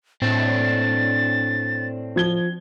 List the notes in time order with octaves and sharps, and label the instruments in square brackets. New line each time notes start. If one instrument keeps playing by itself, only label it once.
[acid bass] A2 [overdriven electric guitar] C4 D4 [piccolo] A6
[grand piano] F3 G#6 G7